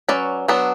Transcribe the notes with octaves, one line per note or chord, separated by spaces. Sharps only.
F#3 C#4 B4 D5
F#3 B3 D4